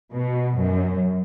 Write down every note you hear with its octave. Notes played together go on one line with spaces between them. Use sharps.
B2
F#2